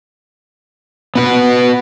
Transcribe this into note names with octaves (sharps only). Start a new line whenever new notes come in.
B3 F#4 B4